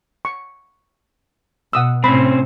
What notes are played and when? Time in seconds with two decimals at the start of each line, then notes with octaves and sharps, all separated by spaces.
0.25 C#6
1.73 B2 F#5 D#6 E6
2.04 A2 C3 C4 C#4 B5